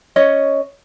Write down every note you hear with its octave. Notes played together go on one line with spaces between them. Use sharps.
C#4 C#5 D#5